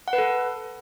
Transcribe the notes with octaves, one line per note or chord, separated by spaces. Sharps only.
F#5
B4
A4